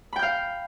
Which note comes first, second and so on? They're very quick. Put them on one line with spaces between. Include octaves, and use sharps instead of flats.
B5 G5 G6 F5